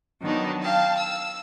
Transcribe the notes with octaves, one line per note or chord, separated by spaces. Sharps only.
D#3 F#3 B3 D4 D#4
F5 G5 A5
E6